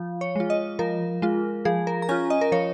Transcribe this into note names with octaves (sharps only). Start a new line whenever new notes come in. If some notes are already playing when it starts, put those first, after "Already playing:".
Already playing: F3
C#5
G#3 F4
D#5
F3 A#4
G#3 F4
F3 G#4
A#4
A#5
C#4 F4 G#5
D#5
A#4
F3 C#5